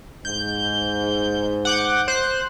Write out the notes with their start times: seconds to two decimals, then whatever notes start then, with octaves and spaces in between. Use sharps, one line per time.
0.25 G#2 G6
1.65 F#5 D6 G6
2.08 C5 F#6